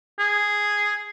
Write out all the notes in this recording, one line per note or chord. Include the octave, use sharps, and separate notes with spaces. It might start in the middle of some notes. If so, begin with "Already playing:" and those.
G#4